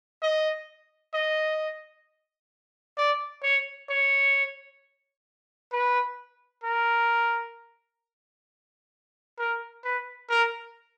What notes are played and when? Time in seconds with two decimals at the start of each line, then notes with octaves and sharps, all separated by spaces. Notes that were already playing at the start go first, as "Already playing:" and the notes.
0.23 D#5
1.14 D#5
2.98 D5
3.43 C#5
3.89 C#5
5.72 B4
6.63 A#4
9.39 A#4
9.84 B4
10.30 A#4